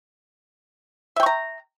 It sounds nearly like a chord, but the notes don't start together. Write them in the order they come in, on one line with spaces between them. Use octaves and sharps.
E5 G5 C#6 A#5